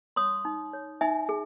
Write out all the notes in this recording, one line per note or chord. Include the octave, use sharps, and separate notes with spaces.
C#5 C6 D#6
D#4
C#5
D#4 E5 G#5
G#4